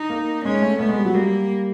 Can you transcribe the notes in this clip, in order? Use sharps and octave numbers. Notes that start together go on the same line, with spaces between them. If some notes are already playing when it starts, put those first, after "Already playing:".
Already playing: D#4
A#3
G#3 C#4
A3
A3 B3
G#3
G3
F#3
G3 A#3